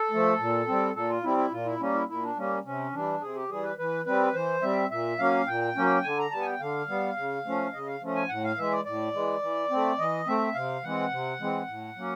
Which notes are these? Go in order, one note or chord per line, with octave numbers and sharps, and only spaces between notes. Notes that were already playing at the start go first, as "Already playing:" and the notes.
Already playing: A4
F3 A3
A#2
G3 C4
A#2 A4
F4
G3 C4 E4
E4
A#2 F4
E4
G3 A#3 C#4
E4
A#2 E4
D4
G3 A#3 C#4
C3 C#4
E3 G3 D4
C3 G#4
G4
E3 G3 G#4
B4
E3 B4
G3 C4 B4
E3 C5
G3 C4 E5
A#2 E5
F#3 A#3 C#4 F5
A#2 G5
F#3 A#3 C#4
D3 G#5
A#5
G3 B3 A5
G#5
G5
D3 F5
G3 B3
C#3
F3 A3 C#4
C#3 D#5
F5
F3 A3 C#4
G#5
A2 F#5
F5
E3 G#3 E5
D5
A2 D5
E3 G#3
E3
A3 C4
E3 D#5
A3 C4 E5
C3 F5
E3 G#3 C4 F#5
C3
E3 G#3 C4
A2
F#3 A#3 C#4